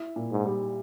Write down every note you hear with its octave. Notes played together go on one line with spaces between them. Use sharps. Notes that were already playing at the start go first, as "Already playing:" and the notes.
Already playing: E4
A#2
G#2
G3